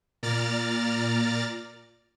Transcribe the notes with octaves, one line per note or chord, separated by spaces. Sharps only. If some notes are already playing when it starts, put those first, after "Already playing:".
A#2 D5 A#5 F6 A6